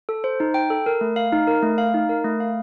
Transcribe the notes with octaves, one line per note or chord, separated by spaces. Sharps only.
A4
C5
D#4
G5
A4
A#4
A3
F5
D#4
A#4
A3
F5
D#4
A#4
A3
F5